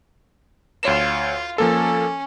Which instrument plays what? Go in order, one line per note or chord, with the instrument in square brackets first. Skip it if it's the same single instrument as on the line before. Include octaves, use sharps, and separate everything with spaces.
[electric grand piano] D2 C#5 E7 [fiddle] F4
[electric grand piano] F3 A#3 A4 [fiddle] C#4